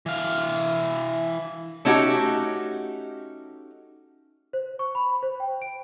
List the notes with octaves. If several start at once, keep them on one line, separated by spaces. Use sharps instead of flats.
E3 F5
A3 C#4 D#4 F#4 G4
C5
C#6
B5
C5
G5
D7